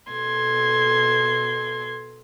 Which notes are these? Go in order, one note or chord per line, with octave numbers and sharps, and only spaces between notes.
B2 A4 C6 G#6